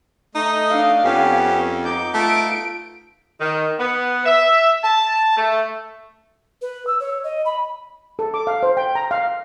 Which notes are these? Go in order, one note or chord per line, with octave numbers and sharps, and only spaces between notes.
A3 D#4 D#5
D4 F5
F2 B3 C#4 G4
C4
B3 D#4 D6 G6
A3 F4 D7
D#3
B3
E5
A5
A3
B4
E6
C#5
D#5
B5
A4
D6
F5
C5
G5
A#5
F5